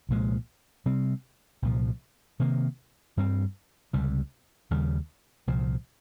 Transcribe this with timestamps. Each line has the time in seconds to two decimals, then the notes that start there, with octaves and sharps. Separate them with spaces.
0.09 C2 A#2 F3 G#3
0.86 C3 G3 C4
1.62 C2 A#2 F3
2.40 C3 D#3 A#3
3.17 G2 G3 C4
3.93 C#2 C3 G3
4.71 D#2 C#3 G3
5.47 C2 A#2 F3